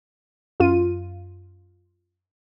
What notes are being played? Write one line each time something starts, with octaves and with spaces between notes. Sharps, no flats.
F#2 F4 D#7